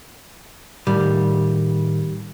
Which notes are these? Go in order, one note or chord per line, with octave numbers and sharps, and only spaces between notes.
A2 D#3 G3